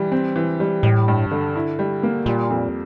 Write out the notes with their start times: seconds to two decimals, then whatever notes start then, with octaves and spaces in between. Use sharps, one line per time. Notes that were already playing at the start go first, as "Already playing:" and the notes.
Already playing: E3 G3
0.12 C4
0.36 E3
0.60 G3
0.83 A2 G3
1.08 G2
1.31 D3
1.56 E4
1.79 G3
2.03 A#3
2.26 A#2 G3
2.50 F2